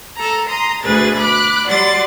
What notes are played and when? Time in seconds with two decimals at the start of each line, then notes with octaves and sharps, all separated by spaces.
0.16 A4 A#5
0.49 A#5 C6 D#6
0.82 D2 B2 G#4 B4 A6
1.16 B5 D6 F#6
1.66 F#3 G3 D5 F#5 C6 A6